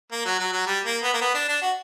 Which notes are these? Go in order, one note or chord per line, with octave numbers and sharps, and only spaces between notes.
A#3
F#3
F#3
F#3
G3
A#3
B3
A#3
B3
D4
D4
F#4